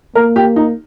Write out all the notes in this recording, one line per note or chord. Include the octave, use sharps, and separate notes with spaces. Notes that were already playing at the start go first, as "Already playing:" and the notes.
A#3 A#4
G4
D#4